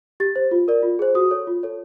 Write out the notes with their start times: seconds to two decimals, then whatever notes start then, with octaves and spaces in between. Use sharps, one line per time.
0.20 G4 A6
0.36 C5
0.51 F4
0.68 A#4 D5
0.83 F4
0.99 G#4 C5
1.15 F#4 D#6
1.31 A4 C#5
1.47 F4
1.63 A4 C#5